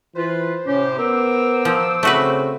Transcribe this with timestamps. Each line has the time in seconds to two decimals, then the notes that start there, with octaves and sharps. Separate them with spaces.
0.16 E3 F4 B4 C5
0.66 A2 C3 C#4 G4
0.99 B3 A#4 C5 D6 E6
1.65 F3
2.03 C#3 A3 C4 F#4 B4